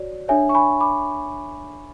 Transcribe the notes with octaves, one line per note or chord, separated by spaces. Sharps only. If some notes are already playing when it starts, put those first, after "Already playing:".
Already playing: F#4 C#5 D5
D4 A4 C#5 E5 G#5
C#6
G#5 B5
B5 D6